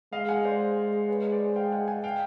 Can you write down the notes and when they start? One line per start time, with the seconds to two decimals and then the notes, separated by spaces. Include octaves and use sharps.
0.13 G#3 D#5 F5
0.29 F#5 G#5
0.45 C5 D5
1.09 B4 C#5
1.32 C5 D5
1.56 F5 G5
1.72 F#5 G#5
1.88 F#5 G#5
2.04 F5 G5